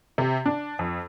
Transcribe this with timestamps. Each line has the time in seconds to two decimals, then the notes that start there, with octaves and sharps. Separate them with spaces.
0.18 C3
0.46 D4
0.79 F2